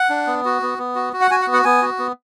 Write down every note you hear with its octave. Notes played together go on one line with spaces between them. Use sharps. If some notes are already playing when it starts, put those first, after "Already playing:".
Already playing: F#5
D4
B3
F#4
B3
B3
F#4
F#4
F#5
F#4 G#5
F#5
B3
F#5
B3 G#5
F#4
B3